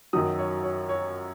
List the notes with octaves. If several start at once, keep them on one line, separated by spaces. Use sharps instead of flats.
F#2 D#3 F#3 D#6
C#5
C#5
C#5